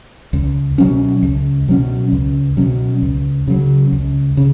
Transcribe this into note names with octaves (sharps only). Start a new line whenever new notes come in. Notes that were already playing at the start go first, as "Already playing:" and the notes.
C#2
B2 F#3 C#4
C#2
B2 F#3 C#4
C#2
B2 F#3 C#4
C#2
C#3 F#3
C#2
C#3